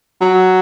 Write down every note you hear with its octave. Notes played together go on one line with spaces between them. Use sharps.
F#3